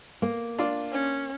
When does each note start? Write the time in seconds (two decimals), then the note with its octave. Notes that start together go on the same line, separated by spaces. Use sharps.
0.22 A#3
0.59 D4 F4 D5
0.92 C#4